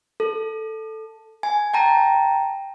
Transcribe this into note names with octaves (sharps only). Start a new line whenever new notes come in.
A4
G#5
G5 A5 A#5